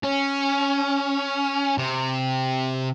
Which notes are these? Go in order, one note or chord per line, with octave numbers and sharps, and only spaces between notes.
C#4
C3